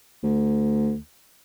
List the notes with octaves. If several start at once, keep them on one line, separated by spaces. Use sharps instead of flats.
D2